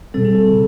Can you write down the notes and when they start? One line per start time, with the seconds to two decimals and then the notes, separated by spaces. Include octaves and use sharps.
0.14 B2 G3 C4 A4
0.25 G#4
0.35 A4
0.52 C#3